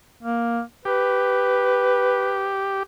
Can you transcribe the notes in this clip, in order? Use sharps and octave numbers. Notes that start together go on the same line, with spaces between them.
A#3
G4 B4